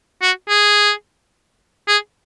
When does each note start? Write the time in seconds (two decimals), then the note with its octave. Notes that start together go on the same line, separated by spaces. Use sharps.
0.22 F#4
0.49 G#4
1.88 G#4